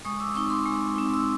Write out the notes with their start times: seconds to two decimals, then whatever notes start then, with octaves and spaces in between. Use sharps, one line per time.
0.05 G#3 C#6 D#6
0.20 D6 E6
0.34 C4 D#4 C#6 D#6
0.50 C6 D6
0.66 G#3
0.96 C4 D#4
1.14 E6